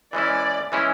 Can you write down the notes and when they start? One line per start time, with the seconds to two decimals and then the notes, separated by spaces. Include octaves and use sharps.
0.13 E3 G#3 C#4 E4 D5
0.72 E3 G#3 C#4 E4